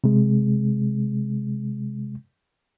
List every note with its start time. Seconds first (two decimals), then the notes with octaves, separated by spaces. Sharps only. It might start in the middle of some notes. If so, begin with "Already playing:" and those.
0.04 C3 G#3